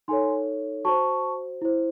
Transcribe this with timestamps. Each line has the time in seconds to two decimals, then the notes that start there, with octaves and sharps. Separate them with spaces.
0.08 D#4 A4 C#5 G#5 C6
0.85 F#4 C5 A5 C#6
1.61 E4 C5